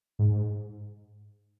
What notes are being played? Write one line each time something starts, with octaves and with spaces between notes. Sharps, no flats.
G#2